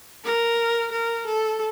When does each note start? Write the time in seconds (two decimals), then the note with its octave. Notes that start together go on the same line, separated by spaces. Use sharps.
0.25 A#4
0.92 A#4
1.26 A4